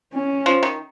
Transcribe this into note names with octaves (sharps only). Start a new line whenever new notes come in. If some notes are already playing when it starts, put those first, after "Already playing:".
C#4
F3
D#3